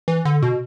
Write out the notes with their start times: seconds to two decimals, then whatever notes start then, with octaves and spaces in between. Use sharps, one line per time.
0.08 E3
0.25 D3
0.42 B2